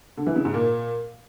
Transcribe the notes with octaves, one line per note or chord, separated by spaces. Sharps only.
D3
E3
C#3
G#2
A#2